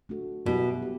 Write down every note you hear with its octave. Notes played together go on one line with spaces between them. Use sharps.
A3 D4 F#4 A4
B2 F#3 B3 E4 G4
G4